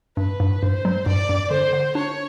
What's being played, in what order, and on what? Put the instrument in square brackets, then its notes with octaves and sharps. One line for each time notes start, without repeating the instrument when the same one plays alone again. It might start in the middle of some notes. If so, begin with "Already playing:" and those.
[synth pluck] G2 [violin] B4
[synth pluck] G2
[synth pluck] G2 [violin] C5
[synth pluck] F#3
[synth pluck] G2 [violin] D5
[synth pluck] G2
[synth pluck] D3 [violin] C5
[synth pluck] D3
[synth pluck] D4 [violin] C#5